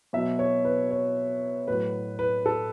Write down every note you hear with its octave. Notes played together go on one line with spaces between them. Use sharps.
B2 F#3 E5
C#5
B4
C#5
A2 F#3 B4
B4
A4